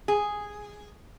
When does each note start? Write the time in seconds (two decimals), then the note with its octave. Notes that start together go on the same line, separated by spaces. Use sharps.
0.08 G#4